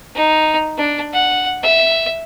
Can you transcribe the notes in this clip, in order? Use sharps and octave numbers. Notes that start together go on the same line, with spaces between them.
D#4
D4
F#5
E5